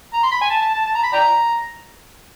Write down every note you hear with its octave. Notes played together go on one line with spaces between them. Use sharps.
A#5
C6
B5
G#5
A5
A5
A5
A5
A#5
B5
D5 G5 A#5